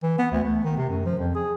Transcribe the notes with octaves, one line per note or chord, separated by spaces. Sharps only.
E3
B3
D2
A3
D#3
C3
F#2
F3
F2
G#4